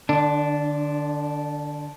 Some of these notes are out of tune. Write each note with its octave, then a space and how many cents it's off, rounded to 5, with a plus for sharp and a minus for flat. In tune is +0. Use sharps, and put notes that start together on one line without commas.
D3 +30 D4 -10